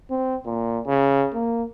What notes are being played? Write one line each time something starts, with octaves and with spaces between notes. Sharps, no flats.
C4
A#2
C#3
A#3